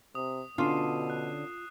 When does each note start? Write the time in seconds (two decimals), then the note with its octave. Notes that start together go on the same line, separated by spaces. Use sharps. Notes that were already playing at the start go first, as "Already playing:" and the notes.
0.15 C3 D#6
0.58 B2 D3 C#4 D4 F4 C7 D#7 E7
1.10 F#6